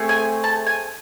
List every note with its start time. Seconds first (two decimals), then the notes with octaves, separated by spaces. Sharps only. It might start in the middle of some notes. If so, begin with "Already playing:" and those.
Already playing: A3 C4 G#4
0.09 G#5
0.44 A5
0.67 G#5